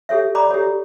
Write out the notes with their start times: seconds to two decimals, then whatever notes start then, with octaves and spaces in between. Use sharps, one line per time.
0.09 G4 A4 C#5 E5
0.35 D5 A#5 B5 D6
0.51 G4 A4 C#5